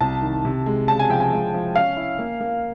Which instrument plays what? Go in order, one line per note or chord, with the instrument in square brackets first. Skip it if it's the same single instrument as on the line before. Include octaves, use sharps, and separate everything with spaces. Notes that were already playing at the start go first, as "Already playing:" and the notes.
[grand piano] C2 [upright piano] A5
[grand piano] D#3
C3
G#3
[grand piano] C#3 [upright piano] A5
[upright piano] G#5
[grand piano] F3 [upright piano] G5
[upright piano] G#5
[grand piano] G#3
F3
[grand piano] C#4 [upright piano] F5
[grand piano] E4
A#3
A#3